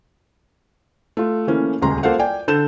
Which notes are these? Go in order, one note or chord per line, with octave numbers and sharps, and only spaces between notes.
A3 F4
E3 A3 A#3 C#4
D#1 C#2 C#3 A#5 C6
A#3 F4 A4 C5 F5 F#5
D5 G5 G#5
D3 A4 G6 E7